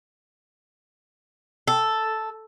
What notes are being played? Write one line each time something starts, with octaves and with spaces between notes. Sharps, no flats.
A4